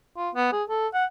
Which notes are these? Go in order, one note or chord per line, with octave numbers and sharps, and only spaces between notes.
F4
B3
G#4
A4
F#5